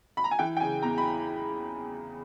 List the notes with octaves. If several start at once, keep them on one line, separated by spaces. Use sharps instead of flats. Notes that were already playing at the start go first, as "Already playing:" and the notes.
B5
A#5
G#5
E3 G5
G5
C#3 G#5
E2 A#5
B5